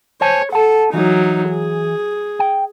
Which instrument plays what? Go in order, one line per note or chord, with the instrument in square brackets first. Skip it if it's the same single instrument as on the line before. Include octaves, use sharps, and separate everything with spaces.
[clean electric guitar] C5 G#5 A5 [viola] C#5
[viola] A4 [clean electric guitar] F#5 A5
[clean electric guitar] E3 [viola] F#3 D#4
[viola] G#4
[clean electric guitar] G5